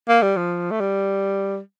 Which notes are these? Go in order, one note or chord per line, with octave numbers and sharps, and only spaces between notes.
A#3
G3
F3
A3
G3